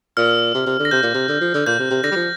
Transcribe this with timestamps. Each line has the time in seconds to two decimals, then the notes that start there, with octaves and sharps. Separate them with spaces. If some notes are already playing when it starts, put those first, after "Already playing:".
0.17 A#2 F6
0.55 C3
0.66 C3
0.79 D3
0.85 A#6
0.91 C3 G6
1.03 A#2
1.14 C3
1.28 D3
1.41 F3
1.54 D3
1.66 A#2 G6
1.79 C3
1.90 C3
2.03 D3 A#6
2.11 G3
2.16 F3